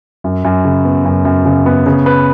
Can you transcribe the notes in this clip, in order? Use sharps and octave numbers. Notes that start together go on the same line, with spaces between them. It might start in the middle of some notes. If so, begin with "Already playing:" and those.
F#2
F#2
C#3
B3
F#2
F#2
C#3
B3
C#3
B4